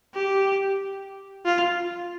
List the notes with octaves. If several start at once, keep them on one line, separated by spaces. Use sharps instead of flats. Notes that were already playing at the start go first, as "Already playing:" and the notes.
G4
F4